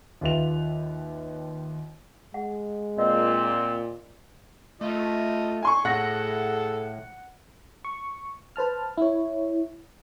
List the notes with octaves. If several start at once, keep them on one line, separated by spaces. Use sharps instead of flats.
D#2 F4 G4 B4 E5 F7
G#3 F#5
A#2 C4 B4 D5 D#5
A3 F4 D#5
G#5 C6 C#6
A2 G#4 A4 F#5 A#6
C#6
B4 C5 A5 F6
E4 C#5